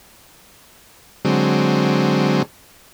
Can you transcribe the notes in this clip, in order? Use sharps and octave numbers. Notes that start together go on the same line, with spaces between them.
D3 F#3 G#3 C4